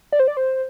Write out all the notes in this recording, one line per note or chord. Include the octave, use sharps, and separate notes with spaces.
D5
C5
D5
C5